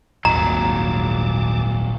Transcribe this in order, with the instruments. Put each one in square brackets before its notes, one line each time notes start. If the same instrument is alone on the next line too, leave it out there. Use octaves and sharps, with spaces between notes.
[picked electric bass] D#1 G#1 [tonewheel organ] D#2 A5 D6 [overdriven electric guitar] A#2 F#3 [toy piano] A#5